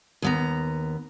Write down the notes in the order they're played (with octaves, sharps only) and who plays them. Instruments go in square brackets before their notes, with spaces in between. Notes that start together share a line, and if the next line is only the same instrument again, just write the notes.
[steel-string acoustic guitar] D#2 B3 A#5